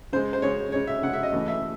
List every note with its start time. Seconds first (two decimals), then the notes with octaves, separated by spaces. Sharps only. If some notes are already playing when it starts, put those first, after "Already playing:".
0.13 C#3 C5
0.16 G#3
0.33 C5
0.42 C#3 G#3 C#5
0.72 C#3 G#3 C#5
0.87 E5
1.03 C#3 F#5
1.07 G#3
1.13 E5
1.23 D#5
1.32 C#3 E3 A3
1.48 E5